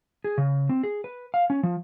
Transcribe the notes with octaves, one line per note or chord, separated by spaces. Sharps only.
G#4
C#3
C4
G#4
B4
F5
C#4
F3